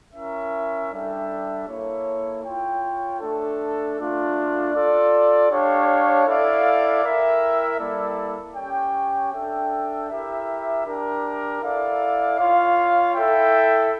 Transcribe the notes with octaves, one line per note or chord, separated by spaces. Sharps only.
C#4 E4 A#4 E5
G3 D4 A4 E5 G5
A#3 E4 A4 C#5
F4 C#5 G5
A3 D4 A4
A3 D4 F4
F4 A4 D5
D4 G4 C#5 F5
E4 A4 D5 F5
E4 A#4 E5 G5
G3 A#3 E4 A4 D5
C#4 G4 C#5 G5
D4 A4 E5 G5
E4 G4 A#4 E5
D4 G4 A#4
E4 A4 D5 F5
F4 C#5 F5
E4 A4 E5 G5